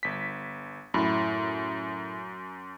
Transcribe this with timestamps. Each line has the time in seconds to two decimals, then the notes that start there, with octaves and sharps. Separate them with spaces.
0.03 G1 B6
0.94 F#2 A2 B5